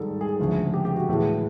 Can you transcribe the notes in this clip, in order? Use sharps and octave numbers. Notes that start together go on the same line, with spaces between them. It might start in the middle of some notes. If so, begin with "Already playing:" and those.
Already playing: G#2 D#3 G3 A4
G#4
D2 C#3 F3 G#3
G4
G4
F#4
A2 E3 G#3